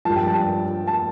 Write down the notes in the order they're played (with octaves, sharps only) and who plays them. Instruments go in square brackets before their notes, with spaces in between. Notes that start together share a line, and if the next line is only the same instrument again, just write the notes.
[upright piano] G2 F3 A5
G5
A5
A5